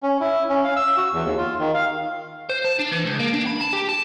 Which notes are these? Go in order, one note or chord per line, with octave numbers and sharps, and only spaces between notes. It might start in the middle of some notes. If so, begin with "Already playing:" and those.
C#4
E4
C#4
F5
E6
F#4
E2
D#2
F4
D#3
F5
C5
A5
D4
E3
C#2
A#3
D4
B5
A5
G4
A5